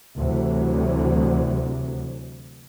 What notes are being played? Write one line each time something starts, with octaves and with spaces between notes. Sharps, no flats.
D2 C3 E3 F#3